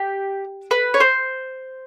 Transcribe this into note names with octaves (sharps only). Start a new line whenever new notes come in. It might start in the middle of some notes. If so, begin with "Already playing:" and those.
Already playing: G4
B4
C#5
C5